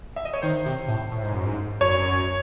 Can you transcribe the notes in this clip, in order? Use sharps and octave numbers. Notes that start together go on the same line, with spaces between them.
E5
D#5
C#5
D#3 C5
C3
A2
A2
G#2
F#2
G#2
F#2 C#5